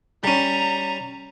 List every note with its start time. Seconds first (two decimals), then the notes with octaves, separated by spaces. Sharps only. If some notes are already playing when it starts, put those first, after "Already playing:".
0.24 G3 C#4 A#5